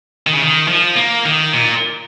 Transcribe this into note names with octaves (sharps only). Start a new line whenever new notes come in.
D#3
C#3
D#3
F3
A#3
D#3
A#2